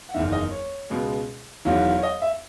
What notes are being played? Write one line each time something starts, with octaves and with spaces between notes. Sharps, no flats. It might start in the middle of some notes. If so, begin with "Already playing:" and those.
F#5
F#1 E2 D#3 E5
D#5
C#5
C#2 B2 G#3
E1 E2 D#3 F#3
C#5
D#5
E5